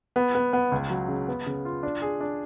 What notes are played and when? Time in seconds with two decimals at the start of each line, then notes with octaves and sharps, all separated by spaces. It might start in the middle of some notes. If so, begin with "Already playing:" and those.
0.16 B3
0.35 B3
0.53 B3
0.72 C#2
0.90 F#3
1.08 C#3
1.28 B3
1.46 C#3
1.65 F4
1.83 D4
2.02 G#4
2.21 D4